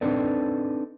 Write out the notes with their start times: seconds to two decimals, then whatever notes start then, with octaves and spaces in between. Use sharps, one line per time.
0.01 C4 D4 D#4 A4 B4 D5